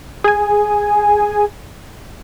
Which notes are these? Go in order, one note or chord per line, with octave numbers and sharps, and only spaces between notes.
G#4 G#5